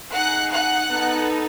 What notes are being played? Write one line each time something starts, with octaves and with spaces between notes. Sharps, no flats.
D#4 G#4 F#5 F#6
F#5 F#6
B3 D#4 A4